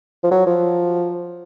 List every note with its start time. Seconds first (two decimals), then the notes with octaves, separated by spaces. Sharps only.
0.23 F3
0.31 F#3
0.47 F3